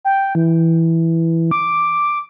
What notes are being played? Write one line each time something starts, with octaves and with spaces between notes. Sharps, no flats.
G5
E3
D6